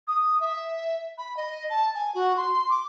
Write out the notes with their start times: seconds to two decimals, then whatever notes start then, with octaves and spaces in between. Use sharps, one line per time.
0.08 D#6
0.40 E5
1.18 B5
1.37 D#5
1.70 A5
1.95 G#5
2.15 F#4
2.37 C6
2.70 D6